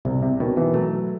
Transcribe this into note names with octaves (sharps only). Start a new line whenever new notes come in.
C2 C3
C3
B2 D#3
E3
F#3 A3